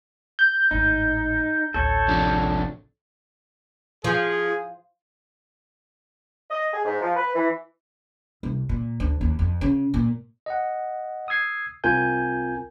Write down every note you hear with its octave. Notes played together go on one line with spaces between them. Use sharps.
G6
G#1 A2 D#4
A1 D2 A4 C#5
C3 F3 D4
F3 G#4
D#5
G#4
G#2
F3
B4
E3
C2
A#2
D2
D#2
F2
C#3
A#2
D#5 F#5
D#6 E6 G#6 C7
C2 C4 F4 A#4 G#5 G6